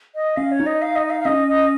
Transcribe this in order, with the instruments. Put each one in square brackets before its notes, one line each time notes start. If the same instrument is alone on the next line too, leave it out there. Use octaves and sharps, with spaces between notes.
[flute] D#5
[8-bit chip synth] C#4 [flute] F5
[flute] C#5
[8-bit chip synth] D#4
[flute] D#5
F5
D#5
D#5
F5
F5
[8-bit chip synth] C#4 [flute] D#5
[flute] D#5